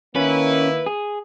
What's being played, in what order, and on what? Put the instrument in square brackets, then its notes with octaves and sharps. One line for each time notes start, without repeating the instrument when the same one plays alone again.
[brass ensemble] D#3 A#3 E4 [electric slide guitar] C#4 [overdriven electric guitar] B4
[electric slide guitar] G#4